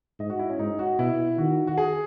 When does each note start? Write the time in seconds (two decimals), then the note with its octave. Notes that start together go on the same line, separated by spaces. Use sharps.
0.19 G#2 D#5
0.30 F#4
0.39 E4
0.50 C#4
0.59 G#2 D#4
0.79 F#4
0.99 B2 E4
1.38 D#3 F#4
1.67 F#4
1.78 G#4